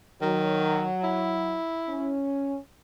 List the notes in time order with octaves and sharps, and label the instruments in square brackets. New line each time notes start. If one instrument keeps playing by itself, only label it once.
[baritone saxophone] D#3 [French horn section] F#3
[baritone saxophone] E4
[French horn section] C#4